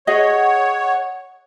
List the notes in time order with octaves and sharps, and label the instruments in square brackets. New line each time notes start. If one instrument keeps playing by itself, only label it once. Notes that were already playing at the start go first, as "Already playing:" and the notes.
[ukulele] G#4 D#5 [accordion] C#5 [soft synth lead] F#5